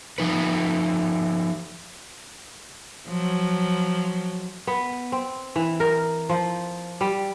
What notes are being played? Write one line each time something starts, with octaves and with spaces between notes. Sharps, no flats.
F3 D#4 B4
F3 F#3
B3
C4
E3
A#4
F3
G3